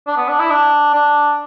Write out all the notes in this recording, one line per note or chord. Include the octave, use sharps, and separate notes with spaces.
D4
B3
D4
E4
D4
D4